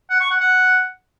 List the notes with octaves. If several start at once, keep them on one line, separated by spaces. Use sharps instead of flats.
F#5
C#6
F#5
F#5